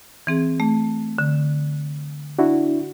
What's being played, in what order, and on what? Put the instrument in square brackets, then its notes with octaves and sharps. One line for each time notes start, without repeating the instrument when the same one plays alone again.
[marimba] E3 C4 G#4
A3
D3
[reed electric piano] D4 E4 F#4